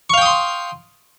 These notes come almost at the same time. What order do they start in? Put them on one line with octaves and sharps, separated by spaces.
C#6 F5 G5 D#6 C6